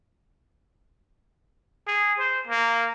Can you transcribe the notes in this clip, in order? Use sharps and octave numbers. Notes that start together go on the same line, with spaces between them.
G#4
C5
A#3